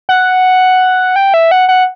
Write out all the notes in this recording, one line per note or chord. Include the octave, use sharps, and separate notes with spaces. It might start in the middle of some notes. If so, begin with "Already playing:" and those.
F#5
G5
E5
F#5
F#5